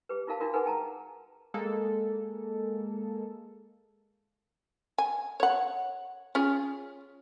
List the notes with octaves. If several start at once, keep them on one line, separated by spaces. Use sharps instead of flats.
G4 B4
D#4 F4 A#4 F5 A5
D4 D#4 F4 F#4 A#4 D#5
D#4 G#4 A#4 B4 F#5 G#5
G5 A5 A#5
G#3 A#3 A4
G#5
C#5 F#5
C#4 F4 G#4